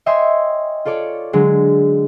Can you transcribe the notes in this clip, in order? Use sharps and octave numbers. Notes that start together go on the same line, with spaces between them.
C#5 D#5 E5 G5 G#5 C6
F4 A4 C#5 D5
D3 F#3 G#3 D4